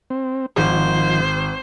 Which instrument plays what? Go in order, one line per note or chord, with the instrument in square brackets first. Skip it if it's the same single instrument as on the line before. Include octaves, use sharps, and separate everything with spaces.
[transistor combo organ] C4
[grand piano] G#1 [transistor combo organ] D#3 F3 [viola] C5